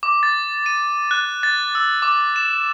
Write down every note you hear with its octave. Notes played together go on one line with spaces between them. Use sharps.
D6
A6
D#7
F#6
A6
E6
D6
E7